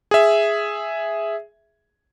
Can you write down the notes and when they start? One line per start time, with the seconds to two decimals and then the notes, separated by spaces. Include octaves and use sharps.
0.11 G#4 E5